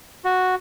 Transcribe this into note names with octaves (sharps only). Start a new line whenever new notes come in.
F#4